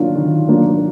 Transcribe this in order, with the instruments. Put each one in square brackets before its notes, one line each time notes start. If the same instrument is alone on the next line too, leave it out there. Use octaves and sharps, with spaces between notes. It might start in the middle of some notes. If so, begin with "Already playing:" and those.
Already playing: [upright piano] D#3 F#3 A#3 D4 F4
D#3
F#3 A#3 D4 F4